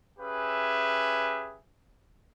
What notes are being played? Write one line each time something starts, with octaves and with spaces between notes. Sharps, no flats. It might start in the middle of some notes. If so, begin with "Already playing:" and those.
C#4 G4 G#4 B4 E5